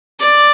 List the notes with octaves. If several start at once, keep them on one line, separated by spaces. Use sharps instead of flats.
D5